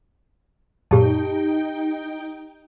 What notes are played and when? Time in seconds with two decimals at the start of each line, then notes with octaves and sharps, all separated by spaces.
0.91 F#2 A#2 D#4 G4 G5 A5